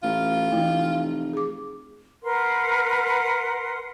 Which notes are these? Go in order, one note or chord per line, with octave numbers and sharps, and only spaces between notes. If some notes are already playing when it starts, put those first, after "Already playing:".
A1 F4
F1 E3 A3 E4
G#4 D6
A#4 B4 F#5 C6